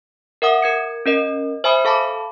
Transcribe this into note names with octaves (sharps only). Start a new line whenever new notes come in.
A#4 E5 F#5 D#6
A#4 G#6 C#7
C#4 A#4 D#5
C5 E5 G#5 B5 D#6
A4 F5 A5 B5 D6